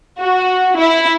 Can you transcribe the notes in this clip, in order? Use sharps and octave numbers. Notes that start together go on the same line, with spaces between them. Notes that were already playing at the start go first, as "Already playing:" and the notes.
F#4
E4